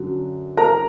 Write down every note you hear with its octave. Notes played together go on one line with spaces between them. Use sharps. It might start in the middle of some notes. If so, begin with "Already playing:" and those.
Already playing: F#2 D3 F#3
A#4 A#5